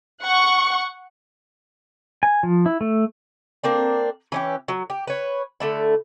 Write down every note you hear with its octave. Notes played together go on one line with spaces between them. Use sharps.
F#5 C#6
G#5
F3
E4
A3
A#3 C4 D4
E3 C#4 G4
F#3
G4
B4 C#5
D3 A3 E4